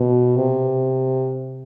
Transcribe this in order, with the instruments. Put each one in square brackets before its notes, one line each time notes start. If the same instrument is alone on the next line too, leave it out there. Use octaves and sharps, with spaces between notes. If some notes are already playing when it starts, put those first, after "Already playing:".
Already playing: [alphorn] B2
C3